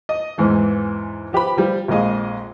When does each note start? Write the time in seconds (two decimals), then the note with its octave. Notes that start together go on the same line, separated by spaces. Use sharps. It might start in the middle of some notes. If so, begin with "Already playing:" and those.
0.09 D#5
0.38 E2 G#2 E3
1.33 F3 G4 B4 B5
1.57 F3 G3
1.88 A#1 F2 G#3 D#5 F5